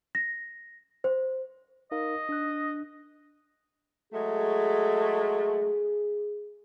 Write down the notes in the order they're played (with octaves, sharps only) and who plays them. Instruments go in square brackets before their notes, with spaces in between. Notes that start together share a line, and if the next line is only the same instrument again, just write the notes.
[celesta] A#6
C5
[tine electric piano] D#4 A#4 F5 [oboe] D#5
[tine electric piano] D4 F#6
[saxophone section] F#3 G#3 A3 [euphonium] G#4